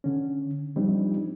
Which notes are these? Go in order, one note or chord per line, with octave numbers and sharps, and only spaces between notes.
D3 C#4
F3 G3 C4 D4 D#4